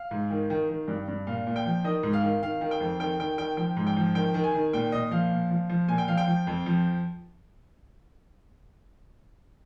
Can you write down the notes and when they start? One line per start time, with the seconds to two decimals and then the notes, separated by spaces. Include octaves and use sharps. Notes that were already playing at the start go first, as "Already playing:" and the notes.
Already playing: F5
0.11 G#2
0.30 D#3
0.50 D#3
0.69 D#3
0.88 G2
1.08 G2
1.27 A#2 F5
1.47 A#2
1.56 G5
1.66 F3
1.84 D#3 D#5
2.03 G#2
2.13 F5
2.23 D#3
2.42 D#3 F5
2.61 D#3
2.71 G5
2.81 F2
2.99 D#3 G5
3.19 D#3 G5
3.38 D#3 G5
3.57 F3 G5
3.77 G#2
3.87 G5
3.97 F3
4.15 D#3 G5
4.34 D#3
4.44 G#5
4.54 D#3
4.73 A#2 G5
4.92 A#2 D#5
5.11 F3 F5
5.31 A#2
5.51 F3
5.69 F3
5.88 A#2 G#5
5.98 G5
6.08 F3 F5
6.17 G5
6.27 F3
6.47 F2
6.66 F3